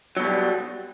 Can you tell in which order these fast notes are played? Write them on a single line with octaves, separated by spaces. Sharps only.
F#3 B2 G3